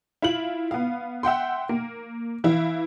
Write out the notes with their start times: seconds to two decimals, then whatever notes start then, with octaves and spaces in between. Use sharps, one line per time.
0.22 E4 F4 F#7
0.71 B3 F5
1.23 E5 F#5 G5 C6
1.69 A#3
2.44 E3 E4 F5